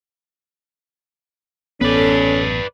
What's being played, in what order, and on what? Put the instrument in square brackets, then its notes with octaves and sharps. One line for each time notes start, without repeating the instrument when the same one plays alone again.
[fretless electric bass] A1 B3 [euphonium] C#4 [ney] A4 [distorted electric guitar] B4 D5